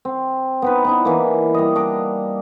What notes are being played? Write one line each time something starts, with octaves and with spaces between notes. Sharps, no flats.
C4
B3 D#4 B4
B3 D4 E4
E3 A#3
G3 D#5
D4 D#5 D6